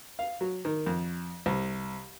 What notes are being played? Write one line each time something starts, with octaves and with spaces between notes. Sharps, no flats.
F5
F#3
D#3
F2
C2